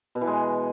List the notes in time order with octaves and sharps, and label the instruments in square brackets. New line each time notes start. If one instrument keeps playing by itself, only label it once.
[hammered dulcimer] B2
E3
G#3